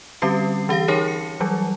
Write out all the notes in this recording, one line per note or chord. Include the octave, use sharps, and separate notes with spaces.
D3 G3 C4 C#4 G4 C7
E3 G4 F5 A#6
D#4 G#4 A#4 C#5 A5
C#7
E3 F#3 G3